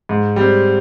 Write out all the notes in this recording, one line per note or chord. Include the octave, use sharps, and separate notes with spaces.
G#2
G3 C4